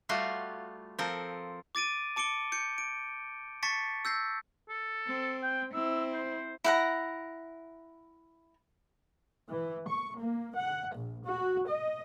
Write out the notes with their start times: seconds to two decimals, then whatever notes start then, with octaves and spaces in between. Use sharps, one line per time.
0.09 G3 A3 F4 F#4 F5
0.99 F3 C4 A4 A#4
1.75 D6 A6 D7 D#7
2.16 A5 D6 C#7 D7 G7
2.52 G6 C#7
2.78 D7
3.63 A5 C#6 A6 B6 C#7
4.05 E6 G6 A#6 C7
4.69 A4
5.07 C4
5.43 G5
5.74 C4 E4 E6
6.14 C5
6.64 E4 F#5 A#5
9.48 E3
9.88 C#6
10.20 A#3
10.54 F#5
10.96 A#1
11.28 F#4
11.68 D#5